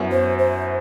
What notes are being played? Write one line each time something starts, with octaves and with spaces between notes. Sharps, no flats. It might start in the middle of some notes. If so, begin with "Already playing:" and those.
Already playing: F#2 F#3 B3 E4
C5
C5